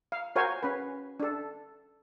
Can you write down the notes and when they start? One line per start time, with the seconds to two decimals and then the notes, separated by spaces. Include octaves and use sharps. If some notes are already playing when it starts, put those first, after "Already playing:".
0.12 F5
0.36 F#4 A#4 C5 C#5 F5 G#5
0.63 C#4 B4
1.20 D4 A4